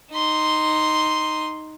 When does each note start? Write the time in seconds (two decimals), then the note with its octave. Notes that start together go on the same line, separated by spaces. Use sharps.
0.12 D#4 C6